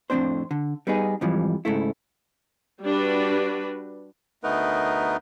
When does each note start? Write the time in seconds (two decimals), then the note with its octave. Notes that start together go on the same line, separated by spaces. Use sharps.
0.10 F2 A2 E3 C4 D4 C5
0.51 D3
0.87 G3 B3 D#4 G#4
1.21 F2 G#2 E3 F3 G3
1.65 G#2 C#3 A3 E4
2.84 G3 D4 F#4 B4
4.44 D2 A3 B3 D#4 A#4 B4